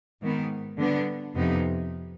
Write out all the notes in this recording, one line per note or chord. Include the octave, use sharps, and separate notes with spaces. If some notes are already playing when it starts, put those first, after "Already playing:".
G#2 D#3 B3
D3 G3 B3 D4
F2 C3 F3 B3 D#4